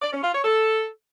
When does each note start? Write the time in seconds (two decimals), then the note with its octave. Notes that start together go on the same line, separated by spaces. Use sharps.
0.02 D5
0.13 C#4
0.23 F4
0.34 C#5
0.44 A4